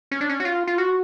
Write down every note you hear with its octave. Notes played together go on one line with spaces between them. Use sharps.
C#4
D4
C#4
F#4
F4
F4
F#4